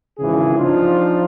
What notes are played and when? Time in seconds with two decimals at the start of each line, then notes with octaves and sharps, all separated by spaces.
0.18 G#1 C#3 E3 G#4
0.57 F3 D4 D#4 F4